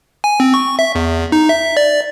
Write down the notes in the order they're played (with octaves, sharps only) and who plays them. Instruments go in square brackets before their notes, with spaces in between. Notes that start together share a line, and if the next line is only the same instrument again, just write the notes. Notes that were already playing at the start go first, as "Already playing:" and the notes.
[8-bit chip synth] G#5
C4
C#6
E5
E2
D#4
E5
D5